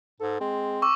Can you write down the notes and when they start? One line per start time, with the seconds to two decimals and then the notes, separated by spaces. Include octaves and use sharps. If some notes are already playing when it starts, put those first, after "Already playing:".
0.20 G#2 A4
0.41 G#3 C4
0.82 C#6 D6 E6